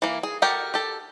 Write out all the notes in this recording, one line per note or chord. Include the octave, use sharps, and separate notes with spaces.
E3 A#3
G#4
F#4 G4 A4 A#4 G5
G4 A4